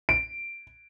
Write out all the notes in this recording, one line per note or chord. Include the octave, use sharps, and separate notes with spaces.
D7